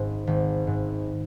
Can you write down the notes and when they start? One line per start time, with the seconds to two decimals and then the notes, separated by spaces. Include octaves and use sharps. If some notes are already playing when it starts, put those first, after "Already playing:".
Already playing: G#1 G#2
0.27 G#1
0.67 G#2